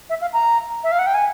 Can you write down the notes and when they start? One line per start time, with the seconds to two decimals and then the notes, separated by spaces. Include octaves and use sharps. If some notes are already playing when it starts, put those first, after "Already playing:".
0.10 E5
0.21 F5
0.33 A#5
0.84 E5
0.92 F5
0.99 F#5
1.06 G5
1.14 G#5